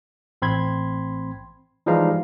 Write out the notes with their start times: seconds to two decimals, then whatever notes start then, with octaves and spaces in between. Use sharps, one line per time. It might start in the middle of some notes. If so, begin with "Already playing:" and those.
0.42 A1 C4 B5 C6 G#6
1.86 E3 F3 G3 G#3 D#4 F5